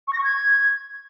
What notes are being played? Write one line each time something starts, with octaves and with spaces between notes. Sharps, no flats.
C#6
A#6
C#6
G#6